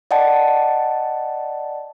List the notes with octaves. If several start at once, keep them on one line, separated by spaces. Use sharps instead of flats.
D5 D#5 F#5 G5 A5